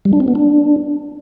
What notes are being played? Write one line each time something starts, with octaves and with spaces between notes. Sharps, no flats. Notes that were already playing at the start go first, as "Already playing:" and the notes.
G3
D4
C4
B3
D4